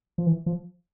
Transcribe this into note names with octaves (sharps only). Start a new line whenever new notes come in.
F3
E3
F3